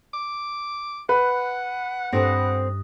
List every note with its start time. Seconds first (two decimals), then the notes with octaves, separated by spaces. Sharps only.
0.14 D6
1.09 B4 F#5
2.12 G2 C4 A4 C5 D#6 A#6